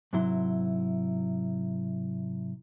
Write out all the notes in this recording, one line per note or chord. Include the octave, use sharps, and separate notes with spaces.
G#2 C3 F#3 E4 C6